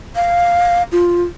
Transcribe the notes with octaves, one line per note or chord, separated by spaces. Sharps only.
F5
F4